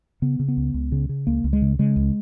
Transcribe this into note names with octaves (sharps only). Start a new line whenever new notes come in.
C#3 B3
C#3
B3
C#2
C#2
C#3
C#3
C#2 A#3
C#2
G#3
C#3
C#3 G#3
C#2